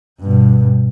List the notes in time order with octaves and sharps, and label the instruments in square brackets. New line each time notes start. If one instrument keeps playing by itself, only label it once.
[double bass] G2 B2